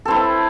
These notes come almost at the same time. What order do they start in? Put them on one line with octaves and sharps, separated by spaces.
A4 C4 E4